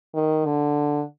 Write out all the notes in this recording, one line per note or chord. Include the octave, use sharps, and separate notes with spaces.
D#3
D3